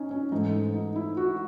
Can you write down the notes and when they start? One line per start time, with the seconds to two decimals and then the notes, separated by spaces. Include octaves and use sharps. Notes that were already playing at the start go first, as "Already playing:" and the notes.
Already playing: C#4 D#4
0.11 C#4
0.32 G#2 E3 A3 D#4
0.74 D#4
0.96 E4
1.17 F#4